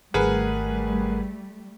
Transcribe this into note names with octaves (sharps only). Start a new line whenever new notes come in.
G#1 G3 A3 G#4 A#4 B4 F#5